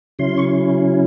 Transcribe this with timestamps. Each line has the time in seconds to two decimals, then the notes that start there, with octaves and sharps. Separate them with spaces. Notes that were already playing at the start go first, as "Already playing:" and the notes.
0.19 C#3 F#3 C#4 E4 C6
0.38 C#6